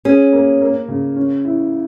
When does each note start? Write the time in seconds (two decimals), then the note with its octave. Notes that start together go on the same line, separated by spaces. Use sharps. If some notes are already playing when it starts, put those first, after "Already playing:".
0.05 C#4 G#4
0.33 A#3
0.62 A#3
0.88 C#3
1.16 C#4
1.45 E4